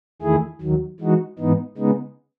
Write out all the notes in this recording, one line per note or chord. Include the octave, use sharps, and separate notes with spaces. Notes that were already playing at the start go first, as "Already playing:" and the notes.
E2 D#3 A3 E4 G#4
D#2 D#3 F#3
E3 G#3 D#4 F#4
G#2 E3 B3 D#4
C#3 G#3 B3 D#4